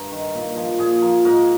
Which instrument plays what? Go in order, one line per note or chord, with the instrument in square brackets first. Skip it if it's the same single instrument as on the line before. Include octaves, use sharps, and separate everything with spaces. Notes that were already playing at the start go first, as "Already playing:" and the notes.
Already playing: [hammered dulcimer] G2 A#4
D#3
A#2
F3
A#2 G#4
F3 A#4
G#2 A#4